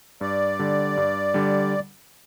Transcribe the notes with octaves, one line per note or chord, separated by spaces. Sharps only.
G2 D5
D3 G3
G2
D3 G3